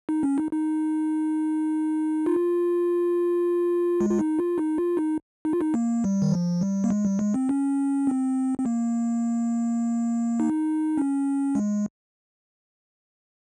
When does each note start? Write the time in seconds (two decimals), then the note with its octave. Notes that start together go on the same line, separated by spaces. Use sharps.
0.09 D#4
0.23 C#4
0.38 D#4
0.52 D#4
2.26 F4
4.00 G#3
4.10 F4
4.19 D#4
4.39 F4
4.58 D#4
4.78 F4
4.97 D#4
5.45 D#4
5.53 F4
5.61 D#4
5.74 A#3
6.04 G3
6.22 D#3
6.32 F3
6.61 G3
6.84 A#3
6.90 G#3
7.05 G3
7.19 G#3
7.34 C4
7.49 C#4
8.07 C4
8.58 C4
8.66 A#3
10.40 D#4
10.98 C#4
11.55 G#3